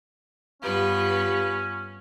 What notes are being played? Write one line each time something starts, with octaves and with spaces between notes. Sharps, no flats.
G2 B3 C#4 F4 G4 B4 F5